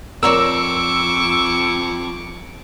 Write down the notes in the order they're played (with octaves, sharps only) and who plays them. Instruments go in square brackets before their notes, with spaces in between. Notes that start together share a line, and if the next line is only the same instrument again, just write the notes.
[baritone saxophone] F2 [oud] A#4 C#5 D5 [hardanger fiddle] C#6 D6 [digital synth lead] E6